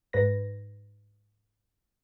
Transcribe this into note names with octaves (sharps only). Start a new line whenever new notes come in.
G#2 B4 A#6